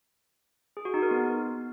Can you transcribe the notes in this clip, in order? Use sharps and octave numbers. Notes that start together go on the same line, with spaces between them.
G#4
F#4
D#4
A#4
B3